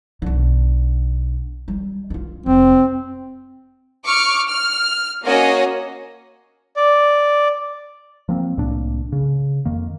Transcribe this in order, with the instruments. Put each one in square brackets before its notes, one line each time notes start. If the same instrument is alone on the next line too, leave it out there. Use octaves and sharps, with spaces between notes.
[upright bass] B1 D3
G3
D#4 F4
[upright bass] F1 [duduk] C4
[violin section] C#6 D6 F6
F6
A#3 C#4 F#4 C#5 D#5 G#5
[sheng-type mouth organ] D5
[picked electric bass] F3 A#3 C4
C2 A2 A#3 D4
C#3
F2 D#3 A#3